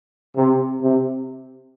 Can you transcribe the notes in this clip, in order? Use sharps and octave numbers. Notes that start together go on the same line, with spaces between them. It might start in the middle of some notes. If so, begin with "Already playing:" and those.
C3
C3